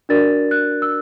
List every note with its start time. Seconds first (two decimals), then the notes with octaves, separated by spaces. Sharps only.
0.09 D4 F#4 A#4 D5 A6
0.51 F#6
0.82 E6